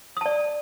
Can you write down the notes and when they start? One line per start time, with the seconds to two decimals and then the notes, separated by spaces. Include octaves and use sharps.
0.17 D#6
0.21 A5
0.26 D5